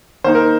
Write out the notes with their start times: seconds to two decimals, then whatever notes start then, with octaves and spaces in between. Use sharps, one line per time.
0.24 D#3 A#3 D#4 C5
0.35 A#4